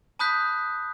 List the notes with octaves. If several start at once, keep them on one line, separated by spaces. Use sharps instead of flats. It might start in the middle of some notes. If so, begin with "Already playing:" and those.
A5 B5 D#6 F#6 G6 B6